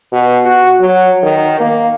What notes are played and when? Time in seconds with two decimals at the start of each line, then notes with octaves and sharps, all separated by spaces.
0.12 B2
0.45 F#4
0.80 F#3
1.23 D#3
1.60 A#3